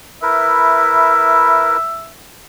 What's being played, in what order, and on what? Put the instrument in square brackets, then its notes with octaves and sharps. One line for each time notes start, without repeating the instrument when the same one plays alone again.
[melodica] E4 A#4 B4 [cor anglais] E5